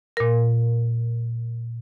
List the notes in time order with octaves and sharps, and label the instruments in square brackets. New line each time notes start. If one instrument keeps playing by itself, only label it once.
[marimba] A#2 A#4